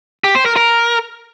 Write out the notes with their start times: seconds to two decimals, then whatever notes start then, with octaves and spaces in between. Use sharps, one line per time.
0.24 G4
0.35 C5
0.46 A#4
0.56 A#4